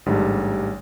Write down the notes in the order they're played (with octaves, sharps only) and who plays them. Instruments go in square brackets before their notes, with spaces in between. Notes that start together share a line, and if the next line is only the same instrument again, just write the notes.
[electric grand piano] A1 G#2 D3 G3